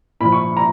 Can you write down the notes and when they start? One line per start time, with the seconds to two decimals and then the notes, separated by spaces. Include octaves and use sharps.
0.20 A#2 B5
0.25 F3
0.32 C#6
0.57 A#5